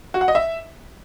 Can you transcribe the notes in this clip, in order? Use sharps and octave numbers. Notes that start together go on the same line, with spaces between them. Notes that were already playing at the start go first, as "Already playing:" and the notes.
F#4
F#5
D#5
E5